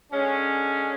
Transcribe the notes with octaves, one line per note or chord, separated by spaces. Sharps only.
D3 G#3 C#4